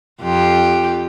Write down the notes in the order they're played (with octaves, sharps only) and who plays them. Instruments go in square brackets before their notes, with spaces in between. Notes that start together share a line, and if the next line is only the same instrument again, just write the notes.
[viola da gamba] F2 F4 G4